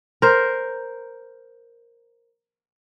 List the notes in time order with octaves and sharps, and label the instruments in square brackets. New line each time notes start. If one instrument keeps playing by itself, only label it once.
[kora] A#4 C5